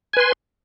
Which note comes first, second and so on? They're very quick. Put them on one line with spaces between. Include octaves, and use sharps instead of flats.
G#5 B4 C6